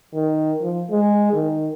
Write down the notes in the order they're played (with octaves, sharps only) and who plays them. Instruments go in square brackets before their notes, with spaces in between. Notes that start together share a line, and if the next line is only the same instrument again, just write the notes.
[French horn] D#3
F3
G#3
D#3